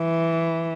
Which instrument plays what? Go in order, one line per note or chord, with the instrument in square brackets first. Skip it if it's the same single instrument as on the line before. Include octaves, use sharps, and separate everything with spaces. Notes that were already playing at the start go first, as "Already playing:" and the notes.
Already playing: [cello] E3